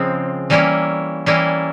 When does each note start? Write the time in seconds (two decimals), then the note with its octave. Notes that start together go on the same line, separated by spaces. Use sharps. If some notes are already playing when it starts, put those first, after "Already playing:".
Already playing: C#3 F3 G#3 C4
0.50 E3 G3 A#3 C#4 E4
1.26 E3 G3 A#3 C#4 E4